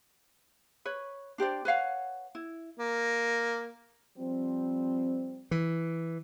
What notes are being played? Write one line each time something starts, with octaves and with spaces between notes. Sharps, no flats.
B4 C#5
D4 G4 C5 D5
B4 C#5 F5 F#5
E4
A#3
F3 G3 C4
E3